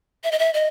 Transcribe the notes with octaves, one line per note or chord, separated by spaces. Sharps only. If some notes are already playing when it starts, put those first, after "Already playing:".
E5
D#5
E5
D#5